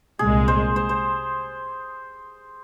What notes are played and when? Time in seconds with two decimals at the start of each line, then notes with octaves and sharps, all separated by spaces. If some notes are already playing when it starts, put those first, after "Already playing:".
0.19 C2 A#2 G#3 G#4
0.48 C5
0.76 C5
0.89 C5